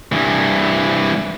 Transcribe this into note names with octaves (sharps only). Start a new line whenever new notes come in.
G2 E3